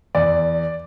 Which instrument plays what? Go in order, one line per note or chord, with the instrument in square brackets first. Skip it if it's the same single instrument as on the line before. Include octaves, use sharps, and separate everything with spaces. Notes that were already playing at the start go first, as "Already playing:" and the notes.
[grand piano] E2 D5